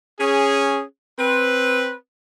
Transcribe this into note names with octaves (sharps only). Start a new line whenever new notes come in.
C#4 G#4
C4 B4